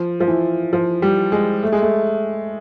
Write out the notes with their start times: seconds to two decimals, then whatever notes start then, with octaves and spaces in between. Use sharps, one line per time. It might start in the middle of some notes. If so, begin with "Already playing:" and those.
Already playing: F3
0.20 F3
0.28 E3
0.73 F3
1.02 G3
1.32 G#3
1.63 A3
1.72 G#3
1.82 A3